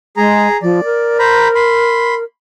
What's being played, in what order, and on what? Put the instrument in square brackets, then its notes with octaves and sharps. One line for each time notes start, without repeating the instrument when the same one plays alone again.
[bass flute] G#3 [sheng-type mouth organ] G#4 A#5
[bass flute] F3 [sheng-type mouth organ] D5
[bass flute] A#4
[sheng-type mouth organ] C5 A#5 B5
B5 C6